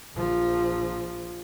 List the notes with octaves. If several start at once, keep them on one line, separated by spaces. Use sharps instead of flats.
A#1 F3